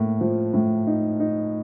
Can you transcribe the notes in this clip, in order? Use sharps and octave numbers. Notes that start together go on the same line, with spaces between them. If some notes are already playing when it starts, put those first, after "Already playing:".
Already playing: A2 A#3
F3
A2
D#4
D#4